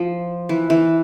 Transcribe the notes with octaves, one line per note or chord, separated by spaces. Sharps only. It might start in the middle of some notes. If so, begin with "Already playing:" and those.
Already playing: F3
E3
E3